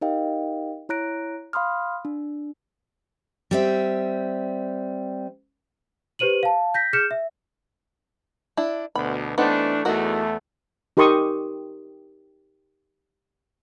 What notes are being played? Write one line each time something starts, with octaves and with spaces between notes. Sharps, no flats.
D#4 G4 A#4 D#5 F5 G5
E4 C#5 A#5 F#6 A#6 D7
F5 B5 C6 D#6 F6
D4
G3 C4 E5
G4 B4 C5 D#7 F#7
F5 A5
G6 A#6 B6
G#4 F6 G6 C#7 E7
E5
D4 E4
D2 B2 B5
E3 A3 B3 C4 D4 D#4
E2 A3 D#4 F#4 A#4
D#4 G4 A#4 C6 C#6 D#6